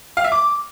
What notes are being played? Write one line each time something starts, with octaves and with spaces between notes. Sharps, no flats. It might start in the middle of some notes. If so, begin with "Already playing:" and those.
F5
E5
D6